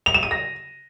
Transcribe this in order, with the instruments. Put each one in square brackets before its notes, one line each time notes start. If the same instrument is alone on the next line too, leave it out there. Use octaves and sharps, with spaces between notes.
[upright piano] F7
E7
D#7
A#6